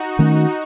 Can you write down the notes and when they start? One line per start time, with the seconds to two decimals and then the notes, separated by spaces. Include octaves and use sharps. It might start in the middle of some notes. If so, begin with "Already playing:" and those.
Already playing: D#4 F#4
0.19 D#3 A3 C#4